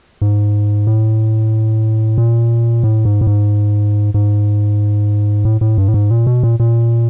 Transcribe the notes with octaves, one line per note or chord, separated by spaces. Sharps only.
G#2
A2
A#2
A2
G#2
A2
G#2
G#2
A2
A2
G2
A2
G#2
A#2
B2
A#2
A#2